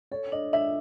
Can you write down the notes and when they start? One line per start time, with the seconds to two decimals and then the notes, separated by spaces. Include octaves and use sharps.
0.11 A4 C#5
0.32 D4 D#5
0.53 D4 E5